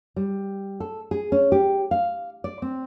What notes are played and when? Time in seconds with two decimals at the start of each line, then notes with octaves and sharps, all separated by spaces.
0.16 G3
0.80 A4
1.11 G#4
1.32 C#4
1.52 G4
1.91 F5
2.44 D5
2.62 C4